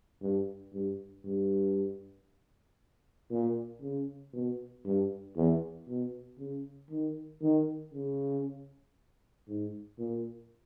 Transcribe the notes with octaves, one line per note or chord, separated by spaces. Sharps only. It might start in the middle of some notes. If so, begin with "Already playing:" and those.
G2
G2
G2
A#2
C#3
B2
G2
E2
B2
C#3
D#3
D#3
C#3
G#2
A#2